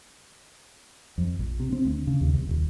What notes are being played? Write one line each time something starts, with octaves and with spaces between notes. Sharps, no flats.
F2
A#1
C3
C4
D2
C#3
D#2
C2
D#1